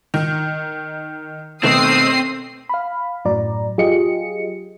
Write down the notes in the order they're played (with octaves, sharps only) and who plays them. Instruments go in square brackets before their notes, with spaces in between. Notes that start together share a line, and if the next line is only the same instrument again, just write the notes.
[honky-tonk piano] D#3
[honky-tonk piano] B2 D#3 A3 [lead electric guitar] C4 [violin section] D#6 C7
[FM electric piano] F5 B5
F#2 A2 F#3 D5 A#5
F#3 F4 G4 G#4 D#5 C#7